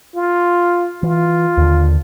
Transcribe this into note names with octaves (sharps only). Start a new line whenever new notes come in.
F4
E3 F4
D#2 D3